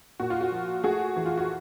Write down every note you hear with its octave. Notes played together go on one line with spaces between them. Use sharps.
A#2 F#4
F4
F#4
F3
A3 F#4 G#4
E3
F4
F#4